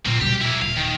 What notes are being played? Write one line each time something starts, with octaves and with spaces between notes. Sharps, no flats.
A#2 A#3 C4
B2 G3 G4
A#3 E4
D#1 F5
D#3